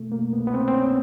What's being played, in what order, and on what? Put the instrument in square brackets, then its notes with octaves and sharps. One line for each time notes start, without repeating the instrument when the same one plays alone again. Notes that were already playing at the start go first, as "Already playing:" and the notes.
Already playing: [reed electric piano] B2 A3
A#3
C2 B3
B3
C4
C4
C2 C#4